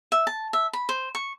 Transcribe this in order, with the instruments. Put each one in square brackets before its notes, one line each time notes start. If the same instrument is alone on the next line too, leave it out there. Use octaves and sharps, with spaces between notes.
[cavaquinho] E5
A5
E5
B5
C5
C#6